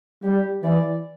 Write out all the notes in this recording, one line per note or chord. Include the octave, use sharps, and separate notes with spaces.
G3 G4
E3 D5